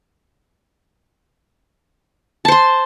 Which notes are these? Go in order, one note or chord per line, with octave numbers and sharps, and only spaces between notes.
C5 A5 C6